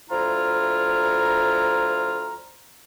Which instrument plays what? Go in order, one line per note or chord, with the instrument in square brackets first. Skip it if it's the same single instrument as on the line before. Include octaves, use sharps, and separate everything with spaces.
[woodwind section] D2 F3 E4 F4 A#5